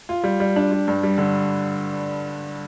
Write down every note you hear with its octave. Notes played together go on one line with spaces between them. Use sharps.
F4
G3
G3
D4
G3
G2
G3
D3